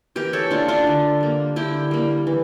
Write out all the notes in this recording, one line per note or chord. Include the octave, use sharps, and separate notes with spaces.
E3 G4 A#4
A4 C#5
A3 D4 F4
D4 F4
D3
G3 A#3
D3 E4 G4
G3 A#3
E3